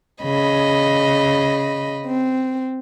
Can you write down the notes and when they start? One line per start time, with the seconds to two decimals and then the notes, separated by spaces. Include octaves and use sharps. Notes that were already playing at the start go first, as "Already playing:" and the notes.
0.24 C#3 D#5 B5
2.07 C4